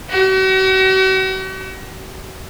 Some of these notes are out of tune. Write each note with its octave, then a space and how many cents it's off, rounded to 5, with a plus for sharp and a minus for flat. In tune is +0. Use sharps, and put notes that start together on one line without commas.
F#4 +40